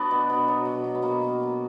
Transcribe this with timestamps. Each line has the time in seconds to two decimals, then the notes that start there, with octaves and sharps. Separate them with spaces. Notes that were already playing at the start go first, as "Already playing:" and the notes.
Already playing: F#3 B3 D4 F#4
0.11 B2
0.30 B2
0.48 F#3
0.65 B2
0.84 B2
0.95 B3
1.02 B2 A#3
1.21 B2
1.40 B2